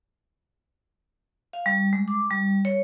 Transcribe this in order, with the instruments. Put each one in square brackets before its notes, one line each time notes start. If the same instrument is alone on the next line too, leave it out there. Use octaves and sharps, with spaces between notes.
[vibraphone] F5
G3
G#3
D6
G3
C#5